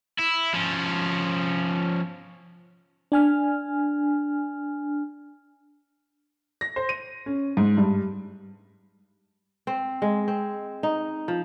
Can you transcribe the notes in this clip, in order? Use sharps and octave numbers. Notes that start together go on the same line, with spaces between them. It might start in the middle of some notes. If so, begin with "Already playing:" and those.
E4
F3 C#4
D4 G#5 F6
A#6
C5
D#7
C#4
G#2
G2
C4
G#3
C4
D#4
F3